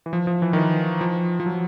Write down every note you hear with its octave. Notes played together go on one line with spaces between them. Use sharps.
E3
F3
F3
E3
D#3
E3
F3
F3
F#3